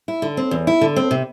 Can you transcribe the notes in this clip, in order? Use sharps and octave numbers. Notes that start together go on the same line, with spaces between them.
E4
D3
C4
E2
E4
D3
C4
C3